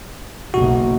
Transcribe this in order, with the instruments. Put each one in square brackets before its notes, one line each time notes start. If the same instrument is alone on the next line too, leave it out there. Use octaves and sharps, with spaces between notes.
[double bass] F#1 B1 [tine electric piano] F#4